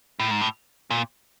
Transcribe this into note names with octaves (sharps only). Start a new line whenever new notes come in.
A2
G#2
A2
A#2